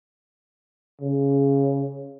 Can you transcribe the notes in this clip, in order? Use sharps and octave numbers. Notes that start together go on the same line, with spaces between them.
C#3